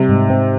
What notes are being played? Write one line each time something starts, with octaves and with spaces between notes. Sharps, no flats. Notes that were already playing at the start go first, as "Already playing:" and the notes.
Already playing: C3 G3
G#2
C4